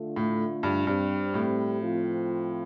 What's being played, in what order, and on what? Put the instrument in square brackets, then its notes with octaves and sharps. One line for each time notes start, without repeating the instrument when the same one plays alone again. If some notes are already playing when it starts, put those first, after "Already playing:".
Already playing: [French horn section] D3 A3 F4
[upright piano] A2
G2
[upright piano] G2 [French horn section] G3 C4 G4
[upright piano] A2
[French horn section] F3 C4 F4